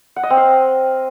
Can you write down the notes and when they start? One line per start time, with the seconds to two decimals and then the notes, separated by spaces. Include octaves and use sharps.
0.16 F#5
0.23 D#5
0.30 C4
0.37 F5